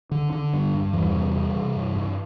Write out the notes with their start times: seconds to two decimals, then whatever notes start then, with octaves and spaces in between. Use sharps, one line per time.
0.11 D3
0.32 D3
0.54 G2
0.74 G2
0.93 E2 E3 G3
1.15 C3
1.35 C3
1.55 C3
1.76 G2
1.96 G2